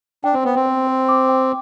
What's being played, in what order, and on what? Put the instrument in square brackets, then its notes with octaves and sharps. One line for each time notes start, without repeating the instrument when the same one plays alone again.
[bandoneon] D4 [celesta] G5
[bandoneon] C4
[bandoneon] B3 [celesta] C5
[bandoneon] C4
[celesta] C5
C5
D6
G5